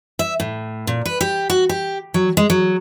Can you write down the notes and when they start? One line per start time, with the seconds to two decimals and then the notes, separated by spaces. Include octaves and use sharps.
0.19 E5
0.40 A2
0.87 A#2
1.06 B4
1.21 G4
1.50 F#4
1.69 G4
2.14 F#3
2.37 G#3
2.50 F#3